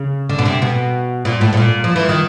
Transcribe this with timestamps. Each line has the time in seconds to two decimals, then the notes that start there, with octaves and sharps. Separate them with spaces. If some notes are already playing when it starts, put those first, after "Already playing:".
Already playing: C#3
0.29 D3
0.39 B2
0.46 C3
0.62 B2
1.25 A#2
1.41 A2
1.53 A2
1.57 A#2
1.84 F3
1.96 E3
2.09 D#3